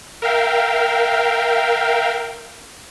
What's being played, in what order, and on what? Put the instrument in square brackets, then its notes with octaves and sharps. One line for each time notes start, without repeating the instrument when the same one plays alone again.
[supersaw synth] A#4 E5 F5 G5